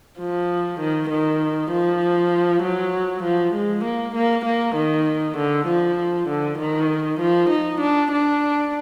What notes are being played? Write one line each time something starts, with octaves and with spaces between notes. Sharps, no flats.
F3
D#3
D#3
F3
F#3
F3
G#3
A#3
A#3
A#3
D#3
D3
F3
D3
D#3
F3
D#4
D4
D4